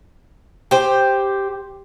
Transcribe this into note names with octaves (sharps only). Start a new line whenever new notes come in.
G4 C5